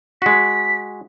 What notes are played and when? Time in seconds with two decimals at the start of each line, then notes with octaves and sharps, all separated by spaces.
0.22 G#3 F#4 B6